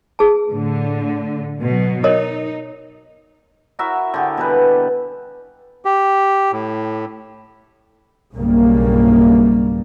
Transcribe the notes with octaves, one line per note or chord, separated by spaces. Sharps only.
G#4 B4 A5
A2 D3
B2 F#3
D#4 A#4 C#5 D#5
E4 F#4 A#4 E5
D3 G4 G#4
B2 G3 B4
G4
A2
B1 G2 C#3 G3 A#3